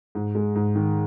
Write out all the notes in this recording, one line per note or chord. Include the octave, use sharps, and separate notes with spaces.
G#2
G#3
G#2
D#3